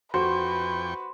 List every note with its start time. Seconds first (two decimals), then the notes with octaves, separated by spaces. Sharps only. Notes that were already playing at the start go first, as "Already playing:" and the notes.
0.14 F2 F#4 B4 C5 G5 C#6